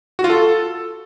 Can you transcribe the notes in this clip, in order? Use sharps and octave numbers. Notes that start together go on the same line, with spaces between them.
F#4
F4
A4